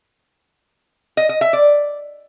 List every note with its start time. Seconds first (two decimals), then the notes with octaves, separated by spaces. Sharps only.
1.17 D#5
1.29 D#5
1.41 E5
1.53 D5